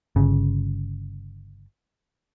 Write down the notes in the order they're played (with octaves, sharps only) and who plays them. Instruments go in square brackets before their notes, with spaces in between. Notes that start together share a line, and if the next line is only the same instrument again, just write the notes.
[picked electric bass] G1 C#3